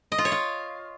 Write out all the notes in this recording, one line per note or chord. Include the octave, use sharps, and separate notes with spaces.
D#5
F4
C#5
F4